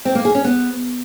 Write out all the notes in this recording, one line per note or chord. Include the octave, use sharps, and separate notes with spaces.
C4
A#3
G#4
C#4
B3